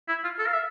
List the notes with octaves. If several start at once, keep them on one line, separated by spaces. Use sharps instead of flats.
E4
F4
A4
F5
E5